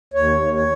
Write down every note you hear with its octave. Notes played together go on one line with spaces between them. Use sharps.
D#2 C#5
D#2
C#5